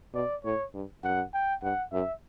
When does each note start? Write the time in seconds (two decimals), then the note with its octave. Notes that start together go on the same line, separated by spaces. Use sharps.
0.14 B2 D5
0.44 A2 C#5
0.74 G2
1.04 F#2 F#5
1.34 G5
1.63 G2 F#5
1.92 F#2 E5